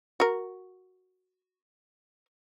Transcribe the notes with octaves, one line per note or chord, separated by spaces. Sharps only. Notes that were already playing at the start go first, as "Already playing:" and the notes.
F#4 A#4